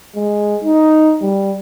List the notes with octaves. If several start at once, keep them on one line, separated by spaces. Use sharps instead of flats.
G#3
D#4
G3